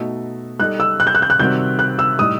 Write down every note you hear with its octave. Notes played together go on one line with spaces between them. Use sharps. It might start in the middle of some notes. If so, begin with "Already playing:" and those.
Already playing: B2 A3 D#4 F#4
G3 D#4 A4 F#6
E6
F#6
G6
F#6
G6
F#6
C3 D#3 G3 C4 F#4 G6
F#6
E6
A2 G3 D#4 D#6